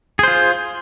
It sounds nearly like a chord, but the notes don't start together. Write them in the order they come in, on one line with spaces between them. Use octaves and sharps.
G#4 C5 F4